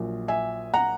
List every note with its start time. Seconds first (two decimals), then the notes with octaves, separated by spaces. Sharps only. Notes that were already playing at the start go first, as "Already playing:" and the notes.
Already playing: A#1 A#2 F#3
0.28 E5 G#5
0.74 F#5 A#5